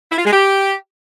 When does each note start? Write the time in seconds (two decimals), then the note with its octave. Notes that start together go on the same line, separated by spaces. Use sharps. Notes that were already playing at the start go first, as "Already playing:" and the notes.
0.11 E4
0.18 F4
0.26 G#3
0.33 G4